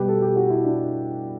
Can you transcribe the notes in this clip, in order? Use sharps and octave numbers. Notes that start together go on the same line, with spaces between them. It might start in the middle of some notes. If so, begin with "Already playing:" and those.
Already playing: B2 G3 G4 B4
A4
G4
F#4
E4
D4